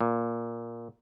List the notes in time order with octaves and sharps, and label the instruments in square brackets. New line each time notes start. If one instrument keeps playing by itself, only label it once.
[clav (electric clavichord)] A#2